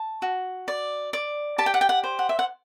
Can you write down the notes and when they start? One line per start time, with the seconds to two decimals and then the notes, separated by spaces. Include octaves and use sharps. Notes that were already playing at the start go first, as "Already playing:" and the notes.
Already playing: A5
0.22 F#4
0.68 D5
1.13 D5
1.58 G4 A5
1.66 G5
1.74 F#5
1.81 G5
1.89 F#5
2.04 C5
2.19 F#5
2.29 E5
2.39 F#5